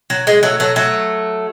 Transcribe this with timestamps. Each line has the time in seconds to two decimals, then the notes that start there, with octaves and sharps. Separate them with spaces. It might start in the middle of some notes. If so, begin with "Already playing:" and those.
0.10 F#3
0.27 G#3
0.43 F#3 A3
0.60 F#3 A3
0.76 F#3 A3